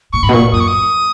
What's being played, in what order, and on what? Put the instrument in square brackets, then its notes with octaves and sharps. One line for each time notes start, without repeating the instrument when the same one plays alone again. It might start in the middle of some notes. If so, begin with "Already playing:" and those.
[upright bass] A#2 [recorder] C#6
[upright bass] G#2 [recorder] B5
[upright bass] B2
[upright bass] A#2 [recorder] C#6
[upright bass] F#2 [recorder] D#6
[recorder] C#6
D#6